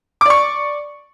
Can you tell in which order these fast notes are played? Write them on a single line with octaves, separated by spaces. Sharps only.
D6 D5 C#6